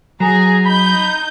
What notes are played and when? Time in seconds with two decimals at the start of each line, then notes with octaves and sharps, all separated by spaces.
0.20 F#3 G#4 A#5
0.66 D#4 B5 G6